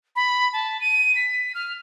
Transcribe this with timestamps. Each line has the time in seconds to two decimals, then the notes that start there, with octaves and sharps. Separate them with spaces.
0.16 B5
0.53 A5
0.81 D#7
1.16 B6
1.55 F6